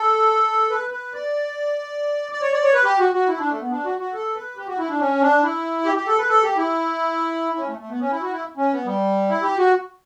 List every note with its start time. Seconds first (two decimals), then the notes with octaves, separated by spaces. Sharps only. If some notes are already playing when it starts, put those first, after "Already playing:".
Already playing: A4
0.70 B4
0.91 B4
1.13 D5
2.32 D5
2.42 C#5
2.53 D5
2.63 C#5
2.74 B4
2.84 G4
2.99 F#4
3.13 F#4
3.28 E4
3.39 D4
3.49 A3
3.60 B3
3.71 D4
3.85 F#4
3.99 F#4
4.13 A4
4.35 B4
4.56 G4
4.67 F#4
4.78 E4
4.89 D4
5.00 C#4
5.21 D4
5.42 E4
5.85 G4
5.96 G4
6.06 A4
6.18 B4
6.28 A4
6.42 G4
6.57 E4
7.57 C#4
7.68 A3
7.79 A3
7.89 B3
8.00 C#4
8.11 E4
8.21 F#4
8.32 E4
8.57 C#4
8.72 B3
8.86 G3
9.29 E4
9.43 G4
9.57 F#4